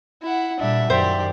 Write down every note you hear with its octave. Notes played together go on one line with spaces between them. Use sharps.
E4 F#5
A#2 G3 D4 E5
F#2 D#3 G4 C5 D5